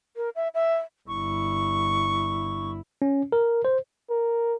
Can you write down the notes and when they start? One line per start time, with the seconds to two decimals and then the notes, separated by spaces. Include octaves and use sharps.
0.16 A#4
0.36 E5
0.54 E5
1.08 G1 E4 C#6
3.02 C#4
3.32 A#4
3.65 C5
4.10 A#4